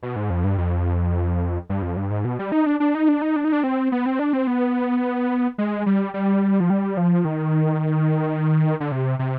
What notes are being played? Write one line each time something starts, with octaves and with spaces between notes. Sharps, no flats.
B2
G#2
F2
G2
F2
G2
F2
G2
G#2
B2
G3
D#4
D4
D4
D#4
D4
D#4
D4
D#4
D4
C4
B3
C4
D4
C4
B3
G#3
G3
G3
F3
G3
F3
D#3
D3
C3
C3